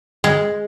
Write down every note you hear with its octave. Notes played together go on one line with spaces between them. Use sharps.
G#3